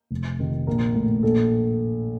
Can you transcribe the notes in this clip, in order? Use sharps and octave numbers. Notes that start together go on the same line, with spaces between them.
F1
F2 C3 D#3
A#1 A#4
A2
A#1 A4